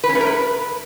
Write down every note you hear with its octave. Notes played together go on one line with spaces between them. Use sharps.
B4
C#4
A3
A#4
B4